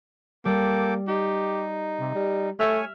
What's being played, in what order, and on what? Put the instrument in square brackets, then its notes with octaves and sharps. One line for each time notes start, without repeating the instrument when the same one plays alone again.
[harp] G3 [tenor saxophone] A#3 [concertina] A4 G5 D6
[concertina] D#4 [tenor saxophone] G4
[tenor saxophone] C3
G3
[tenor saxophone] A3 [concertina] C#5 G#5 [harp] E5 F6